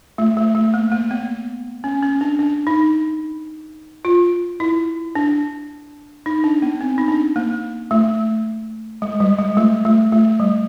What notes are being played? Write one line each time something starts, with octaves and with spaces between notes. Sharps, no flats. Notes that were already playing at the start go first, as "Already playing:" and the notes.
A3
A3
A3
A#3
A#3
B3
C#4
C#4
D4
D4
D#4
F4
E4
D4
D#4
D4
B3
C4
D#4
D4
A#3
A3
G#3
G3
G#3
A3
A3
A3
G3